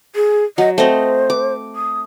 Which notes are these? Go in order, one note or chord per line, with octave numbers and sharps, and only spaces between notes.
G#4
F#3 D#5
A3 C4 C5 D#5
D6
D#6